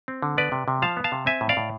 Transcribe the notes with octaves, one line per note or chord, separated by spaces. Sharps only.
C4
D3
B3 B4 D5
C3
C3
F3 F5 A5
B3
F5 A5
C3
C4 E5 G#5
A2
D5 F5
A2